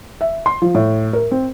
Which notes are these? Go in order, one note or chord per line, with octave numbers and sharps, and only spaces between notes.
E5
C6
F3
A2
A#4
C4